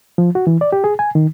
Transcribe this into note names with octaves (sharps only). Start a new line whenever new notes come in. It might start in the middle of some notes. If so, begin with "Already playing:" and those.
F3
F#4
E3
D5
G4
G#4
G#5
D#3